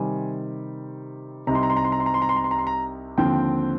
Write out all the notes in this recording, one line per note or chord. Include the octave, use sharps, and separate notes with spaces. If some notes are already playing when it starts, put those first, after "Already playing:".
Already playing: C3 D#3 G3 C4 G#5
C2 C3 G3 C4 D#4 A#5
C6
A#5
C6
A#5
C6
A#5
C6
A#5
C6
A#5
C6
A#5
C6
A#5
C6
A#5
D#2 D3 F3 C4 G5